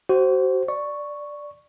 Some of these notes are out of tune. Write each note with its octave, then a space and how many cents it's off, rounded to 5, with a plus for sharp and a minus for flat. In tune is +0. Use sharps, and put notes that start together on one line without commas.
F#4 +35 C5 +0
D5 +0 C#6 +0